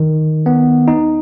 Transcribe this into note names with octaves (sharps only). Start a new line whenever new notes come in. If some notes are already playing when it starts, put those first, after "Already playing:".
Already playing: D#3
B3
D#4